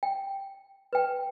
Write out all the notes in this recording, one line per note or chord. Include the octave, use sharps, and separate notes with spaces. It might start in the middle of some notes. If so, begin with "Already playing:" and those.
G5
B4 G5